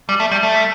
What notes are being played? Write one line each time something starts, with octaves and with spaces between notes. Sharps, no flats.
G3
A3
G3
A3